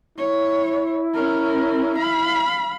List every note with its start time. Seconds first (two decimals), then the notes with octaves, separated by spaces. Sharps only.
0.18 E4 C#5
1.15 C#4 A#4
1.96 F5 B5